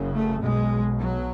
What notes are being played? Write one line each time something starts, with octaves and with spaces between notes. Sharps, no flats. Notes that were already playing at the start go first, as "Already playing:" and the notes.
Already playing: F#1 F#2 C#3
A3
B1 B2 G#3
F#3